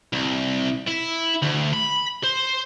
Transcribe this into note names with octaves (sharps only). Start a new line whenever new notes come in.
C2
E4
D2
B5
C5